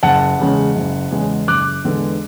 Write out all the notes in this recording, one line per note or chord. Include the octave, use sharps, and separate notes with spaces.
F#1 F#5 A5
E2 C#3 G#3
F#1
E2 C#3 G#3
F#1 D6 F#6
E2 D3 G#3 B3